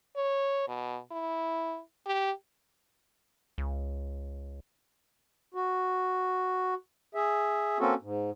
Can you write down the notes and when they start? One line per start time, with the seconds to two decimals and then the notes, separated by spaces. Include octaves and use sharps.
0.17 C#5
0.68 B2
1.12 E4
2.07 G4
3.58 C#2
5.54 F#4
7.15 G#4 E5
7.80 A#3 C4 C#4 F#4 A4
8.02 G#2